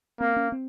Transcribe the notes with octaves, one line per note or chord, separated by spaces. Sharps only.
A#3 C4
C#4
C4